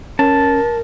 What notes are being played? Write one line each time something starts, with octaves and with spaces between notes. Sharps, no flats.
C#4 A#4 A5